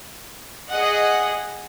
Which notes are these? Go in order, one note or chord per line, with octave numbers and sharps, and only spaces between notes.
G#4 D#5 F#5